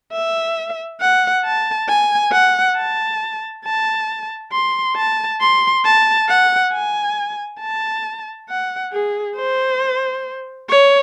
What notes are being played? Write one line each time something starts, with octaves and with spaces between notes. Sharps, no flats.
E5
F#5
A5
G#5
F#5
A5
A5
C6
A5
C6
A5
F#5
G#5
A5
F#5
G#4
C5
C#5